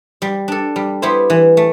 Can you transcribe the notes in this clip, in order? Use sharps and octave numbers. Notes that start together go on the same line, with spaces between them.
G3
D4 A4
G3
B3 E4 G4 C5
E3
A3